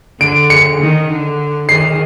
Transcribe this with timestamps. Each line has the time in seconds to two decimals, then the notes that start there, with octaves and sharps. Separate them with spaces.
0.20 D3 D7
0.50 C#7
0.80 D#3
1.09 D3
1.68 D#3 C7